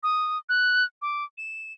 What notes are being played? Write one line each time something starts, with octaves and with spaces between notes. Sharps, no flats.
D#6
F#6
D6
E7